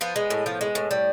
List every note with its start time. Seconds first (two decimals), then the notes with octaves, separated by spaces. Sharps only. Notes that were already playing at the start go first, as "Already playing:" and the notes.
0.01 F3 B3
0.16 G#3
0.30 A2
0.46 F3
0.61 G#3
0.75 A2
0.91 G3